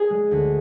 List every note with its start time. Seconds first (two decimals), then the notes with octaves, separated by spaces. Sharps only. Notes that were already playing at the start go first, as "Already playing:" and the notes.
Already playing: G#4 G#5
0.10 G#3
0.31 D2